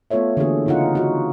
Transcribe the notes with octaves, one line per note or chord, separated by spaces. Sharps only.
A3 B3 F4 A4 C#5 E5
D3 E3 A#3 B3 F#4 G#4
C#3 C4 D#4 F4 F#5
D#4 F#4